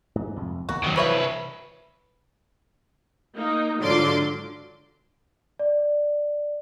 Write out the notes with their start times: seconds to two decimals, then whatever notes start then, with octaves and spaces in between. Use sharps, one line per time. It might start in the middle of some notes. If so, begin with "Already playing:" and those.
0.15 G#2
0.36 C2 F2
0.69 E2 D#3 A#3 F#4
0.84 B1 F#2 D#3 F#3
0.96 C2 E3 F3 B4 C#5 E5
3.37 A#3 D#4
3.80 G#2 D3 F#3 F4 C6 D6
5.59 D5